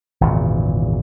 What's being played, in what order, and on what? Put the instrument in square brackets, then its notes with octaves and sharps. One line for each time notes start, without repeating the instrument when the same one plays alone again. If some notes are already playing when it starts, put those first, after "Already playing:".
[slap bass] G#1 E2 A#2 C#3